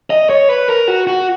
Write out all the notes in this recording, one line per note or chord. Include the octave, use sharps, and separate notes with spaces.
D#5
C#5
B4
A#4
F#4
F#4